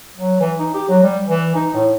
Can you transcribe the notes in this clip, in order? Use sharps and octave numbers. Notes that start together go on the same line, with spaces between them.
F#3
E3
D#4
G4
F#3
G3
E3
D#4
A2